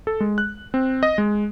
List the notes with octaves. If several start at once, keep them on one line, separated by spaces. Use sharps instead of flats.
A4
G#3
F#6
C4
D#5
G#3